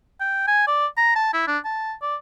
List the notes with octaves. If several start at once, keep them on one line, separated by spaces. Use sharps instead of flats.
G5
G#5
D5
A#5
A5
E4
D4
A5
D5